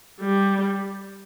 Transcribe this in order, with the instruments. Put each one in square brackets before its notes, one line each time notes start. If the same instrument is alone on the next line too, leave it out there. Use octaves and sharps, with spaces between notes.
[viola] G3